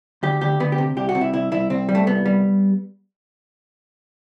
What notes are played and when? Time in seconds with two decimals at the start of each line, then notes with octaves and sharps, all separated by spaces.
0.23 D2 G4
0.41 D2 G4
0.60 D2 B3
0.72 G4
0.78 C3
0.97 C2 G4
1.09 F#4
1.15 C3
1.21 E4
1.33 C2 E4
1.52 C2 E4
1.70 C2 C4
1.89 G3
1.95 A3
2.07 C2 B3
2.26 G3